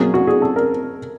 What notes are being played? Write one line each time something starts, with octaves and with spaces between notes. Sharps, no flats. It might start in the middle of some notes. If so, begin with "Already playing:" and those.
Already playing: B2 F#3 A#3 C#4 G#4
F#4
G#4
A4
A#4